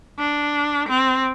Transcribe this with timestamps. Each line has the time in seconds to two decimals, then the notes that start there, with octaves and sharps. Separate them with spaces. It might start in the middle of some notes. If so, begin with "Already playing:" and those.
0.19 D4
0.89 C4